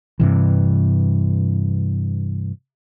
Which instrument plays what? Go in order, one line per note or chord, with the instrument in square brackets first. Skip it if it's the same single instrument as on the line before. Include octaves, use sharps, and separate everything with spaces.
[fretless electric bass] G2 C3 E3